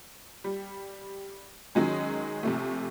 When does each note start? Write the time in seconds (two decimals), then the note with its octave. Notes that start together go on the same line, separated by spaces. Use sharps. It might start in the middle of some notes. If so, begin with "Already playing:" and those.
0.44 G3
1.75 D#3 F#3 G#3 C#4
2.43 A#1 C3 A3